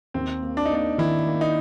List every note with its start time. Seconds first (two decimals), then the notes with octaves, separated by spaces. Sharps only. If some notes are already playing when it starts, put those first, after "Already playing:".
0.14 D#2 C4
0.42 A#3
0.57 D4
0.65 D#4
0.71 A#3 D4
0.98 D#3 E4
1.27 A#3
1.41 D#4